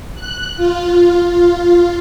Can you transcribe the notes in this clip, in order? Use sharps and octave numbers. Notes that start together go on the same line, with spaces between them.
F#6
F4
F4